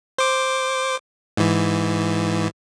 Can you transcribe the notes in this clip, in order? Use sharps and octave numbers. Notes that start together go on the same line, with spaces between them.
C5 D6
G#2 E3